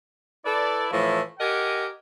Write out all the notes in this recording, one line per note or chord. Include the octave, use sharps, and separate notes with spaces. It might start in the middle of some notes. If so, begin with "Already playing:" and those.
E4 A4 B4 D5
A2 E3 F3
G4 A#4 D#5 F#5 G#5